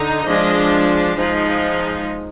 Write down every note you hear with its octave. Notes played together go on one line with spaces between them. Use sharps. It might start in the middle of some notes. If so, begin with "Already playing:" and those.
Already playing: D3 D#4
F3 G#3 D4 D#5
F3 G#3 D#4